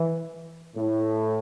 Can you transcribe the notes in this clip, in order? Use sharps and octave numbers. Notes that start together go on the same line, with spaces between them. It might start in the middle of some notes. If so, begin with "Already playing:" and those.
Already playing: E3
A2